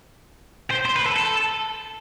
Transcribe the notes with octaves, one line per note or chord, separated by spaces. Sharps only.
C5
C5
B4
A4
A4